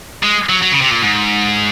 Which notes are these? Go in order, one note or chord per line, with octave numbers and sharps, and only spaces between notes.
G#3
F#3
F#3
C#3
C3
A#2
G#2